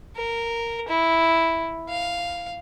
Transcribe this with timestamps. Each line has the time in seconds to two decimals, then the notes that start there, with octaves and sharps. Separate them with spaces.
0.16 A#4
0.89 E4
1.89 F5